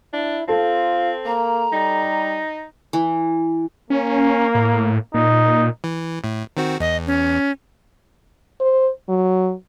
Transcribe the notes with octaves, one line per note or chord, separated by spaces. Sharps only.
D4 E4
C4 F4 A4 A5
A#3 A#5
G3 D#4
E3
A#3 C#4
A2
A#2 D#4
E3
A2
D#3 C4 F#4
E2 D#5
C#4
C5
F#3